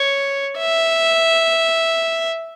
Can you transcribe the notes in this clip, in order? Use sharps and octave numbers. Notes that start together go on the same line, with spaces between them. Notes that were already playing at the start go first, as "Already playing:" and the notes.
Already playing: C#5
E5